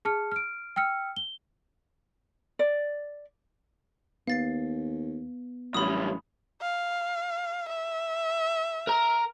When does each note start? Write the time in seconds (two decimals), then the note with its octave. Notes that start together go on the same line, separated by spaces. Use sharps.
0.05 G#4 A5 F6 C#7
0.32 F6 D7
0.76 G5 E6 F6 C#7
1.16 G7
2.59 D5
4.27 D#2 B3 F5 A6 C7
5.74 A1 F#2 G3 B5 D#6
6.62 F5
7.69 E5
8.87 A#4 A#5